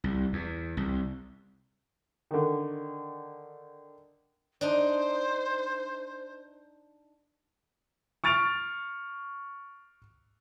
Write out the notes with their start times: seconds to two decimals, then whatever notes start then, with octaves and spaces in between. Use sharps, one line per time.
0.04 C2
0.33 E2
0.77 C2
2.31 D3 D#3
4.61 D4 D#4 C5
8.24 C#6 F6 A6 D7 F7